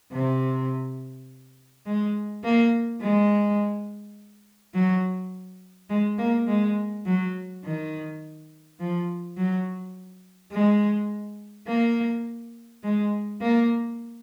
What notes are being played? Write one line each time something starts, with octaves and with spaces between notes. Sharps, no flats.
C3
G#3
A#3
G#3
F#3
G#3
A#3
G#3
F#3
D#3
F3
F#3
G#3
A#3
G#3
A#3